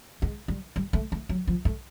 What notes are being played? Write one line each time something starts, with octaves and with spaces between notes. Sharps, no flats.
G#3
G3
G3
A3
A3
F#3
F3
A3